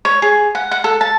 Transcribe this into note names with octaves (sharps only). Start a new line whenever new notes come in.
C#5
G#4
F#5
F#5
A4
A5